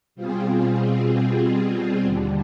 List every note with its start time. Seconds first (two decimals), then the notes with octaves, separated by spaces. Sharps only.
0.15 B2 G3 C4 F4 G#4
2.01 D#2 D3 G3